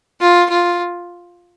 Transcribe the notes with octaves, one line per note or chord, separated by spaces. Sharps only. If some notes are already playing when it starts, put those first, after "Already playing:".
F4
F4